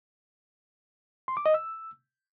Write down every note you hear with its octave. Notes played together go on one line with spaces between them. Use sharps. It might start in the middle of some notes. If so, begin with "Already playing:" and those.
C6
D6
D#5
E6